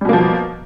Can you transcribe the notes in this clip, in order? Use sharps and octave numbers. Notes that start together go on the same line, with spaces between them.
B2 F3 G3 A#3